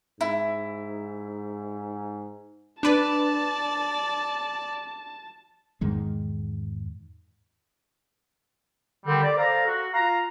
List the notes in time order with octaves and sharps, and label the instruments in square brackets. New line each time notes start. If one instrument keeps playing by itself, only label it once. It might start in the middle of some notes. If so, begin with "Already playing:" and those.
[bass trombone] G#2 [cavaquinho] E4
[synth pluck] D4 B4 [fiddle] D5 [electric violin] A5
[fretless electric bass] E2 G#2 D#3 G#3
[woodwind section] D3 D#3 G3 C4
D5
A4 C5 F5 A#5
F#4
F4 F5 A#5